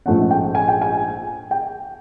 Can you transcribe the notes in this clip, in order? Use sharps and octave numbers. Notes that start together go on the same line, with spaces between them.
A#1 G#2 F3 A3 C#4 F#5
G5
G#5
G5
G#5
G5